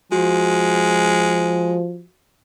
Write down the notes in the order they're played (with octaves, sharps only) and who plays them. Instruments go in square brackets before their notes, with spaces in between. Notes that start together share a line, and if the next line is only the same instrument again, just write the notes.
[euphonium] F3 [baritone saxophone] G#3 [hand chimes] F#4